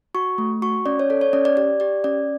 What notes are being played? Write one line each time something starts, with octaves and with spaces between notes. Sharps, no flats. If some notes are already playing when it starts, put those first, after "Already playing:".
F#4 C#6
A3
F#4 C#6
C#4 D5
C#5
A4 D5
C#5
C#4 D5
D5
G4 D5
G4 D5
C#4 D5